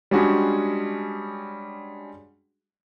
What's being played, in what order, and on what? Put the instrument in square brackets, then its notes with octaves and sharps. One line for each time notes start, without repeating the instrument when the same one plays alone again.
[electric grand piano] G3 G#3 C#4 D4 F#4 G#4